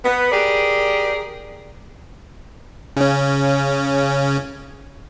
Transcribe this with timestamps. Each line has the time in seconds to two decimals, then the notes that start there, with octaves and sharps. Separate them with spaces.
0.03 B3
0.31 G4 G#4 A#4 D5
2.97 C#3 C#4